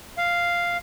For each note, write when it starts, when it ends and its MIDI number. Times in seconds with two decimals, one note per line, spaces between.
0.17 0.77 77